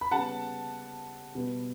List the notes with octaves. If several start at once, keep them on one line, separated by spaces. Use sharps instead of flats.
B5
C#3 G3 B3 F#5 A5
B2 G3 B3